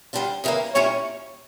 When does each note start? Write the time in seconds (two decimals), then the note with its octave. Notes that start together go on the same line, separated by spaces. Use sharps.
0.13 D3 G3 D4 F4
0.44 C#3 E3 G3 A#3
0.74 A#2 G3 C#4 E4 A#4 C#5